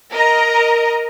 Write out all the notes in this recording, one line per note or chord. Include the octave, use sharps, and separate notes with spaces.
A#4 D#5 A#5